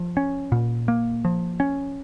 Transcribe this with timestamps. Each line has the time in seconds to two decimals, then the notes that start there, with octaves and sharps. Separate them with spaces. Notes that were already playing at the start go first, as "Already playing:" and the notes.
Already playing: F3
0.17 C#4
0.52 A#2
0.88 A#3
1.25 F3
1.60 C#4